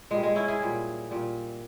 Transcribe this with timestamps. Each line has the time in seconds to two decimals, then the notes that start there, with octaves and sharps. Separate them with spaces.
0.10 A#2 G3 G#3
0.23 G#3
0.35 C#4 E4
0.48 E4 G#4
0.60 A#2 G3
1.11 A#2 G3